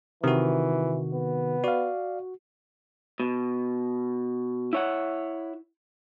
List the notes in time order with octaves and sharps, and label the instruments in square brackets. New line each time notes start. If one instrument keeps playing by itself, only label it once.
[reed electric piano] C3 [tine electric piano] D#3 F#4 [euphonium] E3
[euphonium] B3
[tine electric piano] F#4 [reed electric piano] D5 F5
[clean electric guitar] B2
E4 C#5 F#5